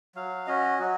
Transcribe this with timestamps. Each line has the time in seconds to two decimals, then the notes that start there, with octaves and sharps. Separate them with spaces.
0.15 F#3 F5
0.47 C#4 F#4 D#5
0.79 F#3 F#4